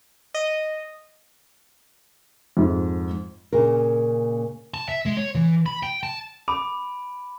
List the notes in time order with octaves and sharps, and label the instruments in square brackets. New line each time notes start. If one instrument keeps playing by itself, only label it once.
[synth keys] D#5
[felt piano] F2 G#2
[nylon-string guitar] A#2 C#3 A#4
[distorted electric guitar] A5
E5
G#3
C#5
E3
B5
G5
A5
[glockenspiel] B5 [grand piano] D6